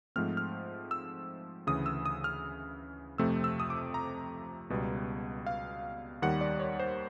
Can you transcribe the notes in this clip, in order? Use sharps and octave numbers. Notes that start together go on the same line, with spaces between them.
G#2 F3 A3 C4 F6
F6
E6
D2 C#3 E3 D#6
E6
D#6
F6
F2 C3 F3 A3 C4 E6
E6
D#6
D6
A#5
C#2 B2 G3 B3
F5
D#2 D#3 G3 F#5
D5
C#5
C5